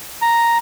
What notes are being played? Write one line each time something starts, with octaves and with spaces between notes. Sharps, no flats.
A#5